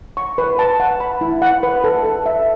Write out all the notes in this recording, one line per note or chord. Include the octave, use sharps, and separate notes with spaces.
C#6
B4
A5
F#5
B5
E4
F#5
B4
A4
A4
E5